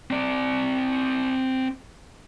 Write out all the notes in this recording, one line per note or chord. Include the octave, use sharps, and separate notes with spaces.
C4 D5